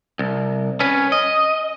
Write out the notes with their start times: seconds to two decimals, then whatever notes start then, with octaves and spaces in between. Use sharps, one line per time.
0.19 C2
0.80 C#4 B4
1.12 D#5